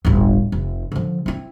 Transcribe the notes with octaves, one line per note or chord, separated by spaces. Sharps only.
D1 G1
F1
D3 F3
C4 E4